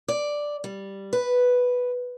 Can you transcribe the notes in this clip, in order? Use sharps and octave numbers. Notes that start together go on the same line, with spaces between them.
D5
G3
B4